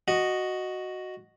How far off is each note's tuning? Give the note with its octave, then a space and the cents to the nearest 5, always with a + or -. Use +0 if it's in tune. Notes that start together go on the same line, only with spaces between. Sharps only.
F#4 +0 D#5 -5